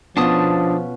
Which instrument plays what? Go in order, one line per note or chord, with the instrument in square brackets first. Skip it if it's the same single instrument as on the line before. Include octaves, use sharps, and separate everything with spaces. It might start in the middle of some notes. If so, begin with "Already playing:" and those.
[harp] B2 C#4 F4 [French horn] F3 [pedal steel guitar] D4 A5 D#6